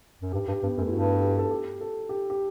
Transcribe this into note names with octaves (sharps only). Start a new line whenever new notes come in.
F#2
G2 G4
G2 G4
G2 B3
F#2 A3
E4
G2 F#4
A4
G4
A4
G4
A4
G4
G4